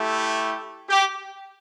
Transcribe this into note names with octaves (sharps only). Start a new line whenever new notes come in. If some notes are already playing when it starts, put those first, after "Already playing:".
Already playing: A3 E4 G4
G4